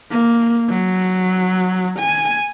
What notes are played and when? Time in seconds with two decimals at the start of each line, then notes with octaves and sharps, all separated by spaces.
0.11 A#3
0.69 F#3
2.00 G#5